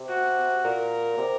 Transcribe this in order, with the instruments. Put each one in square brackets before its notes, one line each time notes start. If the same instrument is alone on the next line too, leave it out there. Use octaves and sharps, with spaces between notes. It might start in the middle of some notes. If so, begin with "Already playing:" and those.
Already playing: [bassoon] C3
[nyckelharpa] F#4
[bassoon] A#2 [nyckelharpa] A#4
[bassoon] C3